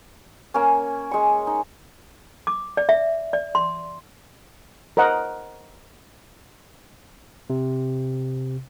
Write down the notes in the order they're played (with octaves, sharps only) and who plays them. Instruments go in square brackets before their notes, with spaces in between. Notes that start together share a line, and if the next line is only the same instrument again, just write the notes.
[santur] A#3 C#4
G#3 C#6
D#4
[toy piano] D6
D5
E5
D5
C6
[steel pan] A#4 C5 D#5 F#5
[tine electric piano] C3